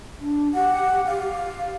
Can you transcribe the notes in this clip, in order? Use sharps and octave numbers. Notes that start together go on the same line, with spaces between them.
D4
G4 F#5
F5